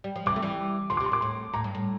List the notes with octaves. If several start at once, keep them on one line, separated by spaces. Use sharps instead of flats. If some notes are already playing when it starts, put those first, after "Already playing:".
G3
F3
C3 E3 D6
A3
E3 G3
D3 F3 C6
D6
C3
C6
A#2 D6
A2 C6
A2 A#5
G2
A2